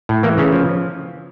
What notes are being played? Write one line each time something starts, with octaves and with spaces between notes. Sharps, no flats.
A2
E3 A#3
C#3 C#4
F3